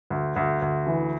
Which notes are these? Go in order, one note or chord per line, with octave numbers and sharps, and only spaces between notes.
D2
D2
D2
E3